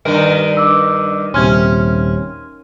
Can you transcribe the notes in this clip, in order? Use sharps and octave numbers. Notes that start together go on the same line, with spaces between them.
G2 D#3 A#4 D7
D6 E6
D#1 C3 C#4 C6 F6 G#6